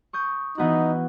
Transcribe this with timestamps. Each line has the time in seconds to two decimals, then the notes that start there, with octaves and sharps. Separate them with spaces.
0.13 C#6 D#6 G6
0.58 E3 B3 D#4 F#4